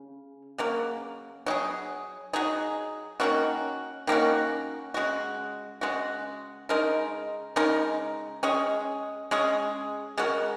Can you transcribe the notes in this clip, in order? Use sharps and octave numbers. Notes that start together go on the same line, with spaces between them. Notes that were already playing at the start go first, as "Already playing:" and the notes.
Already playing: C#3
C#3 F#3 A#3
F#3 D#4 G#4
F#3 D#4 G#4
D#3 A#3 C#4 F#4
D#3 A#3 C#4 F#4
C#3 G#3 F#4
C#3 G#3 F#4
C#3 G#3 D#4 A#4
C#3 G#3 D#4 A#4
G#3 C#4 G#4
G#3 C#4 G#4
C#3 G#3 F#4 A#4